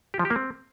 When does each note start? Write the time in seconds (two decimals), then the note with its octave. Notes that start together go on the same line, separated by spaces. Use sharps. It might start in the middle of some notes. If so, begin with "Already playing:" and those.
0.14 G4
0.19 F3
0.25 G4
0.30 A#3
0.36 C4